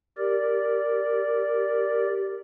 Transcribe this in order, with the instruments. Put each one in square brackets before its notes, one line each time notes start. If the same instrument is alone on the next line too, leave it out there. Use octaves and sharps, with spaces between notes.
[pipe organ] G4 A#4 D5